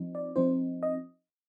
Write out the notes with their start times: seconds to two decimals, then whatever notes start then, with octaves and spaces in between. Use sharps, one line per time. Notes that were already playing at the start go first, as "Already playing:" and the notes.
Already playing: F3 C4 D#4
0.15 D5
0.36 F3 C4 D#4 C5
0.83 D#5